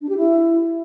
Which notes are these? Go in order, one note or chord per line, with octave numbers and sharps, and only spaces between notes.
D4
G4
E4